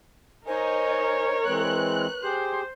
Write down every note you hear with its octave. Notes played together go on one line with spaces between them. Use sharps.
D#4 A#4 C5 C#5 D#5 G#5
E3 G#3 C4 B4 F#6
G4 G#4 C5